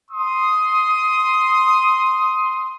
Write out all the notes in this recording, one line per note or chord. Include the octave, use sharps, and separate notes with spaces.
C6 D#6